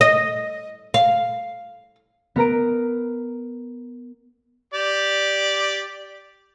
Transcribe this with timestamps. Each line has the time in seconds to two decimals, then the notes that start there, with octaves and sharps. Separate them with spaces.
0.01 D#5
0.94 F5
2.36 B3 A#4 A#5 D7
4.74 G4 D5